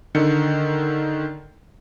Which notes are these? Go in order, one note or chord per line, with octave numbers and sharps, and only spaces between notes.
D3 D#3 A4 C#7